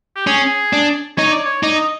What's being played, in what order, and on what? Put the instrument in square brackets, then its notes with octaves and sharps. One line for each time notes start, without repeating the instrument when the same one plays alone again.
[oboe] G4
[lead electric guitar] C#4 [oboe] G#4
[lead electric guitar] D4
[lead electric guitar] D#4 [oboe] C#5
[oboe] D5
C#5
[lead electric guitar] D#4 [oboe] D5
[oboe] D#5